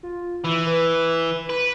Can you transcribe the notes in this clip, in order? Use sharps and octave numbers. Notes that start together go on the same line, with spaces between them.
F4
E3 E4
B4
B4